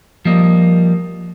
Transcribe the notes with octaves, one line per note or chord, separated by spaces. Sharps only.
F3 G3 A#3 D#5